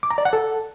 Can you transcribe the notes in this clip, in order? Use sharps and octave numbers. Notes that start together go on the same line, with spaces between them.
D6
A#5
D5
F#5
A4